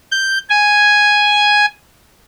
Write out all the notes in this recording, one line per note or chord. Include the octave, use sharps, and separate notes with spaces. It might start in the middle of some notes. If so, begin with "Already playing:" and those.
G6
G#5